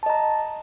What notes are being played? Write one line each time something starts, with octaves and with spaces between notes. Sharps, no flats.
D#5 A5 A#5